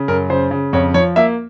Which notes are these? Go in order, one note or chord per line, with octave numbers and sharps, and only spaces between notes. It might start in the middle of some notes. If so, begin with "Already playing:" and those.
Already playing: C#3
F#2 A#4
C#3 C5
C#3
F2 C#5
F3 C#5
A#3 E5